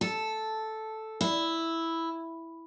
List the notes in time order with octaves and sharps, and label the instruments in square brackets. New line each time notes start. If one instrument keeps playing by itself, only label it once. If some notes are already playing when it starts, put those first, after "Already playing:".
[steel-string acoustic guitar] A4
E4